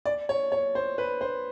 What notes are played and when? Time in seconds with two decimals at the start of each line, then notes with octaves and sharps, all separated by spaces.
0.06 D5
0.29 C#5
0.52 C#5
0.75 C5
0.98 B4
1.21 C5